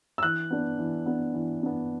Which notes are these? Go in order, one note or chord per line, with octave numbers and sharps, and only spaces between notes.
E6
E3 F#6
B3 D4
E3
B3 D4
E3
B3 D4